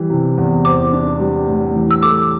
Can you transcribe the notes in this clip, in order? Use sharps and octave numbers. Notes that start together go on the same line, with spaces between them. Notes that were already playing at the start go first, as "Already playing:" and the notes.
Already playing: E3 G3
C3
E2
C5 D6
D4
G3
A2
E3
E6
A4 D6